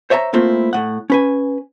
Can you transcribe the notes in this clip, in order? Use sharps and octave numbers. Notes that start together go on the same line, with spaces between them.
C5 C#5 E5 G#5 A#5
A3 A#3 C4 E4 F4
A2 F#5
C#4 B4 G#5